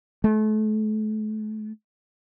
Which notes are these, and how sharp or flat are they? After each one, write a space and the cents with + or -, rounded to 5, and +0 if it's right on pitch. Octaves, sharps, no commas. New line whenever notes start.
A3 -35